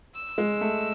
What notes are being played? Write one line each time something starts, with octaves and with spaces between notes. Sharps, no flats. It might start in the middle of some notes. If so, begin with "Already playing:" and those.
E6
G#3
A3